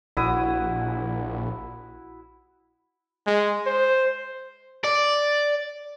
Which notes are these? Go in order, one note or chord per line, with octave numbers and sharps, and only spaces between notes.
A#1 E4 F#4 D#6
G#3
C5
D5